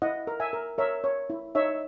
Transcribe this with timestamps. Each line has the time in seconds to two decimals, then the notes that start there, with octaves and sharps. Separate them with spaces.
0.02 E4 D#5 F#5
0.27 A#4
0.40 E5 G#5
0.53 A#4
0.78 A#4 C#5 E5
1.04 C#5
1.30 E4
1.55 D#4 C#5 E5